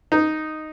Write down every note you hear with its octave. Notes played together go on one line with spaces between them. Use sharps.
D#4